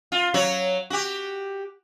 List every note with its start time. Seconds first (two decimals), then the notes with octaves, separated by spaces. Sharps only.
0.12 F4
0.34 F#3 F#4 C#5
0.90 F#4 G4